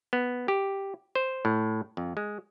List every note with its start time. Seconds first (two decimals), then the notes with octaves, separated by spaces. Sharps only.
0.13 B3
0.48 G4
1.15 C5
1.45 A2
1.97 F2
2.17 G#3